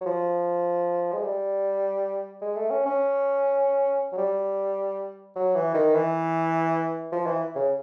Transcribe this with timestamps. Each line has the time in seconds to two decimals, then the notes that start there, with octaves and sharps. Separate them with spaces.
0.01 F#3
0.06 F3
1.13 G#3
1.23 G3
2.41 G#3
2.56 A3
2.71 C#4
2.86 C#4
4.12 F#3
4.18 G3
5.35 F#3
5.55 E3
5.74 D#3
5.95 E3
7.12 F3
7.27 E3
7.56 C#3